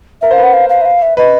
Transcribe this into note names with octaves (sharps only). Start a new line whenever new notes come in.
A#4 E5
C5 F5
B4
F#5
F5
F5
E5
F5
E5
B4 D#5